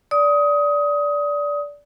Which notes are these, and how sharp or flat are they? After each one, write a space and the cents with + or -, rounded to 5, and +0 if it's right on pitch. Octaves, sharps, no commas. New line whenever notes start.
D5 -15 D#6 +20